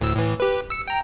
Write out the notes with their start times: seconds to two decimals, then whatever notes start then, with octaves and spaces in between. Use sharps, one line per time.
0.01 D2 A2 E6
0.15 A2 E3
0.40 G4 B4
0.70 E6 C#7
0.88 G5 A#5